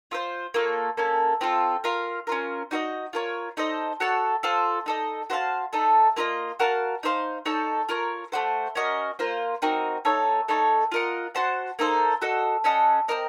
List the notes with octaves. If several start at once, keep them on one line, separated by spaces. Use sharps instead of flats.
F4 A4 C5
A#3 F4 A4 C#5
A#3 C#4 A4
C4 F4 A4
F4 A#4 F5
C#4 F4 A#4
D#4 F#4 C5 D#5
F4 A#4 C#5
D#4 A4 C5 D#5
F#4 A4 C#5 A5
F4 A4 C5
D#4 A4 D#5
F#4 C5 F5 A5
A3 D#4 A4
A#3 F4 A4 D#5
F#4 A#4 F5 A5
D#4 A4 C5 F5
D#4 A4 C#5 A5
F4 A#4 C#5
A3 D#4 F#4 C5
C#4 F#4 A#4 D#5
A#3 F4 C5
C4 D#4 F#4 A#4
A3 D#4 A4 C#5
A3 D#4 A4 C#5
F4 A#4 D#5 F#5
F#4 C5 F#5 A5
A#3 D#4 A4 C5
F#4 A4 D#5
C#4 A4 D#5 F#5
C4 D#4 A#4 D#5